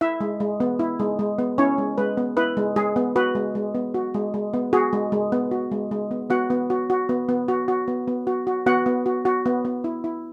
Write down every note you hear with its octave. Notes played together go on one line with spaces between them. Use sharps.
E4 E5
G#3
G#3
B3
E4
G#3
G#3
B3
C#4 E4 C#5
G#3
G#3 B4
B3
E4 B4
G#3
G#3 G#4
B3
F#4 B4
G#3
G#3
B3
F#4
G#3
G#3
B3
F#4 G#4
G#3
G#3
B3
F#4
G#3
G#3
B3
B3 F#4 F#5
B3
F#4
F#4
B3
B3
F#4
F#4
B3
B3
F#4
F#4
B3 F#4 F#5
B3
F#4
F#4
B3
B3
E4
E4